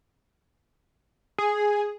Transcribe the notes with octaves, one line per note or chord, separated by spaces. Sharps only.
G#4